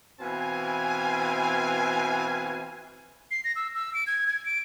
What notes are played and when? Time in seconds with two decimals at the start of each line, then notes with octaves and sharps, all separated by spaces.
0.20 B2 E3 C4 F5 G#5
3.31 C7
3.44 A#6
3.56 E6
3.75 E6
3.94 D7
4.07 G#6
4.27 G#6
4.46 D7